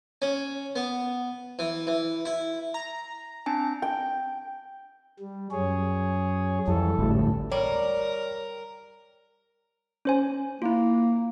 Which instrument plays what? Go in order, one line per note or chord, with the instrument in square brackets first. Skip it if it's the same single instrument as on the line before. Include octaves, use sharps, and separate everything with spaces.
[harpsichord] C#4
B3
E3
E3
E4
[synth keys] A#5
[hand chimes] C4 D4 G#5 [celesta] A5
[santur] G5
[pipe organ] G3
F#2 G#4 C#5
[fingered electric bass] F2 [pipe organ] E3 G3 A4
[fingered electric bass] G#1 D2 A2
[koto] G3 [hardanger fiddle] A#4 [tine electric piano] C#5
[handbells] C#4 C5 G#5
[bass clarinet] A#3 [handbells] E4 F4